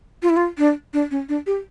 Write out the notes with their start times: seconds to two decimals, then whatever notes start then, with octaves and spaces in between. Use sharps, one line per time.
0.23 F4
0.29 E4
0.37 F4
0.58 D4
0.94 D4
1.11 C#4
1.29 D4
1.47 G4